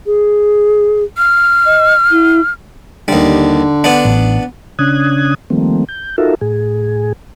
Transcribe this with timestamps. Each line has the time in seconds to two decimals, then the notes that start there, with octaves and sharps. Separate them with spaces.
0.06 G#4
1.18 F6
1.66 D#5
2.11 E4
3.08 D#2 D3 G3
3.84 B3 D4
4.05 A1
4.79 C#3 C#4 D4 D#6 F#6 G#6
5.50 D#3 F3 G3 A3 A#3 C4
5.89 G6
6.18 D#4 F4 F#4 A4 A#4 E5
6.41 A2 G#4